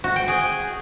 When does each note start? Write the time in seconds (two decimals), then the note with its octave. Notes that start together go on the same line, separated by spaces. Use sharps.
0.04 F#4
0.16 G5
0.28 G#4